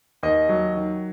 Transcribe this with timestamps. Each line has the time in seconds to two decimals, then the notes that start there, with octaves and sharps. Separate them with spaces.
0.23 D#2 D#5
0.49 F#3
0.76 D#3